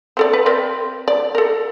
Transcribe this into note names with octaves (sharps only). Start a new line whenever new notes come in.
C4 A4 D5
B4
C4 A#4 D5
D5
A4 A#4